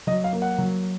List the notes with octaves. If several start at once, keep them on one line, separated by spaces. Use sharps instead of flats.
F#3 D#5
F5
A#3
F#5
F#3